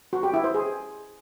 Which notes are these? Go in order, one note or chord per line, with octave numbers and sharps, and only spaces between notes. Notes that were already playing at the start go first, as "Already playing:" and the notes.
F#4
G4
E4
C5
G#4